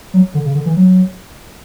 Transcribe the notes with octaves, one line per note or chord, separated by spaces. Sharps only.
F#3
D3
C#3
D3
E3
F#3